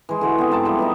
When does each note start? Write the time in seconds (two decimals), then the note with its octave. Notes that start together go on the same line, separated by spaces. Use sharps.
0.09 E3 G#3
0.21 D3 G#3 F#4
0.38 B3 C4
0.52 G#2 E4 A5 D6
0.65 F3 G3
0.79 B3 D#4 E4